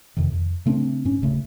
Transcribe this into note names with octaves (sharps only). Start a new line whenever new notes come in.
F2 C3 D#3
F2
C#3 A3 C4 D4
G#2 C#4
D#1 C#3 A3